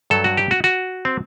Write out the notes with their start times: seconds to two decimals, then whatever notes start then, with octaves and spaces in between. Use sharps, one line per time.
0.10 G2 F#3 A4
0.24 F#4
0.37 G4
0.51 F#4
0.64 F#4
1.05 C4